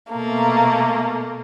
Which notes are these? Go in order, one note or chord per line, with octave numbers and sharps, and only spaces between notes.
B2 A3 A#3